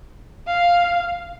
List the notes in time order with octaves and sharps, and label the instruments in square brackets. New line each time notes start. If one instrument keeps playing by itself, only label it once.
[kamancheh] F5